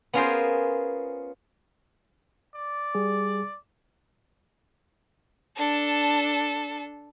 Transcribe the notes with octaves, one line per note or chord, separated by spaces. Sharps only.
B3 C#4 F4 G#4 A#4 C5
D5
G3 G#4
D4 A4